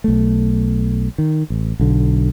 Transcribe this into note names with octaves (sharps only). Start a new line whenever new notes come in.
B1 A3
D#3
A1
B1 D3